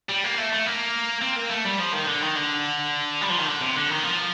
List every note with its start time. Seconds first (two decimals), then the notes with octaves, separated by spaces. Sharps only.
0.09 G3
0.24 A#3
0.38 A3
0.52 A3
0.66 A#3
1.22 C4
1.36 A#3
1.51 A3
1.65 G3
1.79 F3
1.93 D#3
2.07 D3
2.21 D#3
2.35 D3
3.21 G3
3.29 F3
3.38 D#3
3.48 D3
3.61 C3
3.76 D3
3.90 D#3
4.04 F3